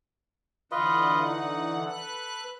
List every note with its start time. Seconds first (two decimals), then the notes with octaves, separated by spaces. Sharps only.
0.71 D3 E3 F4 B4 D#5 F#5
1.26 D#4
1.86 A4 B4 F#6